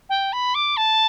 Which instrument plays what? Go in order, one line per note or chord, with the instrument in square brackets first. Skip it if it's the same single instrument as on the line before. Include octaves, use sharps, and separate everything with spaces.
[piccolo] G5
B5
D6
A5